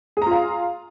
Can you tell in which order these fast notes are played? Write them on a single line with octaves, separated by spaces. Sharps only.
G#4 A#5 F4 F5